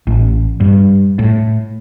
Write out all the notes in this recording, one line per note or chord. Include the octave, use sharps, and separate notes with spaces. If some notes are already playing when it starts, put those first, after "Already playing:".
A1
G2
A2